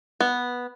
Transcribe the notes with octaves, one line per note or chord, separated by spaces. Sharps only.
B3